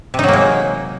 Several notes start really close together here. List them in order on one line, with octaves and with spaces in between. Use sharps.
C3 D#4 F#3 A#3 G#3